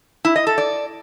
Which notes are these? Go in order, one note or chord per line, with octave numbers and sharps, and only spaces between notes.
E4
D#5
A4
D5